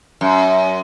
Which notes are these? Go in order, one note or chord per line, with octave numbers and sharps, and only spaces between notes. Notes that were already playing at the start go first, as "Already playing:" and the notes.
F#2